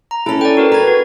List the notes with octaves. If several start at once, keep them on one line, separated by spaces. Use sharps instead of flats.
A#5
C#4 E4 A4
D5 G5
F#4 A#4 B4
B4 A#5 G#6
F#4